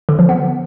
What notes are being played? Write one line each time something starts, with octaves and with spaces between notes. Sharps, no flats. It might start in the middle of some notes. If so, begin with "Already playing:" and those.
D3
F3
B3